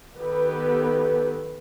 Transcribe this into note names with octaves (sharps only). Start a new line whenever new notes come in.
D#3 B3 G4 A4 B4